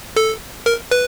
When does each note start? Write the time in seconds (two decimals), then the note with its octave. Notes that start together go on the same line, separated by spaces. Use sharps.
0.16 A4
0.66 A#4
0.91 B4